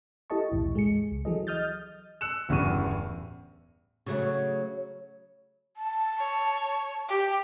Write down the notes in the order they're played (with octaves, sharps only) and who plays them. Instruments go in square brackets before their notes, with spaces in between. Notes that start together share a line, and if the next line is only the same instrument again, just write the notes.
[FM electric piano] E4 G4 A4 D#5 A5 C#6
B1 E2 A2
G#3 G#4 C#7
C#2
E3 F#3 G#4 A4 D#5
D#5 D#6 F6 G6 A6
[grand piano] E6 F#6 C#7 E7
D1 E2 G2 C#3 C#6 D#7
[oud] C#3 F#3 A3
[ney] A5
[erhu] C#5
G4